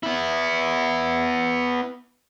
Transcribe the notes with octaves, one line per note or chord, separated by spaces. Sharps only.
B3 E4